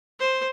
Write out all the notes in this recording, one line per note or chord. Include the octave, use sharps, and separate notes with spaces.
C5